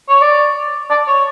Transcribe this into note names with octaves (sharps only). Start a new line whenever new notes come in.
C#5
D5
D5
C#5